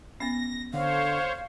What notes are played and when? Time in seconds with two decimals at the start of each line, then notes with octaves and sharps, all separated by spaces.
0.20 B3 C#4 A#6
0.74 D3 C5 C#5 F5